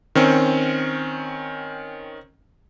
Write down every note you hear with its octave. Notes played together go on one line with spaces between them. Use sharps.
D#3 C4 C#4